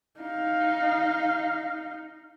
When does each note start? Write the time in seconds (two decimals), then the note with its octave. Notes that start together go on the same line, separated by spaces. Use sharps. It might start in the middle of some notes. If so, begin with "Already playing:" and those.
0.20 D#4 F5